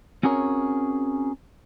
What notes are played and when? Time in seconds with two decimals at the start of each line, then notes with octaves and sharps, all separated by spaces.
0.23 C4 C#4 F#4 G#4 A#4 C#5